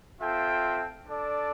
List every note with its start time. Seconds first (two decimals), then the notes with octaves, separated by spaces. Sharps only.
0.20 C4 F4 A4 E5 G5
1.06 D4 A4 D5